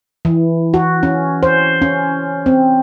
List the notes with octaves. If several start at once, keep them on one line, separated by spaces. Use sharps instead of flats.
E3
F#4
C#4
C5
C#4
C4